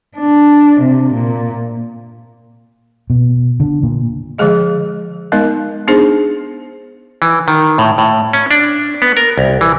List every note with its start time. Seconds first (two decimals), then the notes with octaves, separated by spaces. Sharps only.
0.16 D4
0.81 C3
1.14 A#2
3.10 B2
3.60 D3
3.83 A#2
4.38 D3 F3 G#3 G#4 D#5
5.32 G#3 B3 D#4 A#4 D#5
5.88 B3 D4 D#4 G#4 C5
7.22 E3
7.48 D#3
7.78 A2
7.98 A2
8.33 C#4
8.51 D4
9.02 B3
9.17 A#4
9.38 C2
9.61 E3